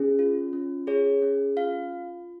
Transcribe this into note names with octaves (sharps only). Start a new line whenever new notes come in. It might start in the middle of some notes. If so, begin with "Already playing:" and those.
Already playing: C#4 G#4
F4
C#4
G#4 C#5
C#4
F4 F5